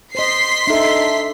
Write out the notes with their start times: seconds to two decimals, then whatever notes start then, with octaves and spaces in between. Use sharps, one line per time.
0.15 C5 D#5 C6 B6 C7
0.67 D4 D#4 A4 E5